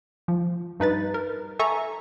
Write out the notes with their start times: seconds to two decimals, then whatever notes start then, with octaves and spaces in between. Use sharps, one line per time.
0.28 F3
0.80 G2 D#4 B4 A6
1.14 A#4
1.59 A4 E5 G#5 A#5 C#6